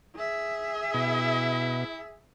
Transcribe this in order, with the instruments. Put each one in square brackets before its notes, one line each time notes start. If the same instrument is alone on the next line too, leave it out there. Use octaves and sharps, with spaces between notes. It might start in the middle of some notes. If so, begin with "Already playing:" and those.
[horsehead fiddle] G#4 E5
[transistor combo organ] B2 [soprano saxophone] E4